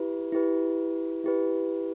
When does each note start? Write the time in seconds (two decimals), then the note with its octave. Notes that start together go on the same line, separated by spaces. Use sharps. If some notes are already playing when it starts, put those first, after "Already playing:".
Already playing: E4 G4 B4
0.32 E4 G4 B4
1.24 E4 G4 B4